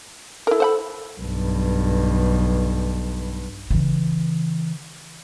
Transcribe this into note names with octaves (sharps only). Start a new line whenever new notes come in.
E4 A4 A#4
C5 F#5 B5
B1 G2
C#3 E3